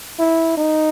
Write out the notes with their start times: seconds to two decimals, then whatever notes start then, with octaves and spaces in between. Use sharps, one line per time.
0.19 E4
0.57 D#4